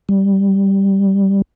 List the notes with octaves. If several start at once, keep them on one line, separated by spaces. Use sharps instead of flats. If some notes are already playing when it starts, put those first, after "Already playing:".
G3